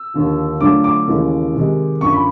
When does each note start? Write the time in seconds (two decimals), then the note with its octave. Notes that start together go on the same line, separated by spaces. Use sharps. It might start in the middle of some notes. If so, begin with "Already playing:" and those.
Already playing: E6
0.14 D#2 D3 F3
0.61 D3 F#3 A3 D4 F4 D6
0.84 D6
1.07 D#2 C#3 E3 G#3
1.55 C3 D#3 G#3
2.01 F#2 D3 F3 C#6
2.13 B5